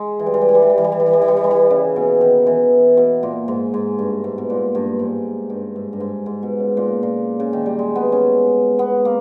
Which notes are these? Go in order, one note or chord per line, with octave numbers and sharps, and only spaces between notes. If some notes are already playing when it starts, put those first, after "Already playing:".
Already playing: G#3
E3
G3
E3
G3
E3
G3
E3
G3
E3
G3
E3
G3
E3
G3
E3
G3
E3
G3
E3
C#3
B2
D#3
E3
B2
A#2
G#2
G#2
G2
G#2
B2
A#2
G2
G#2
G2
G#2
G2
G#2
G#2
B2
C#3
A#2
A#2
C#3
D#3
G3
G#3
B3
C#4
B3
A#3